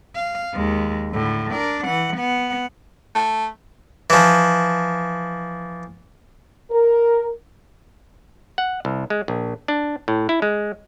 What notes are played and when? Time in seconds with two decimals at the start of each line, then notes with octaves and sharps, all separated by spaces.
0.15 F5
0.53 D#2 G#3
1.11 A2 D3
1.51 D4 A#4
1.85 E3 F#5
2.17 B3 F#5
3.15 A3
4.10 E3 F3
6.71 A#4
8.58 F#5
8.85 C2
9.10 G#3
9.28 A#1
9.68 D4
10.08 A2
10.29 E4
10.42 G#3